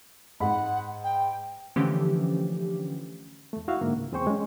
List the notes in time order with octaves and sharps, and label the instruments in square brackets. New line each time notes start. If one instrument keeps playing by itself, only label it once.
[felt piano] G#2 B5 [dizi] F#5
[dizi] G5
[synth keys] D3 E3 F3 A3 C#4 G4
[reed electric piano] E2 A3
E4 F#4 E5 F5
G#2 D3 A#3
C#2
E2 C4 G#4 C5 G5 C#6
G#3 C#4